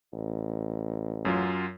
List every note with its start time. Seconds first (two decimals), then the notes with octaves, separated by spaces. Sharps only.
0.13 A1
1.25 F#2 F#3 F4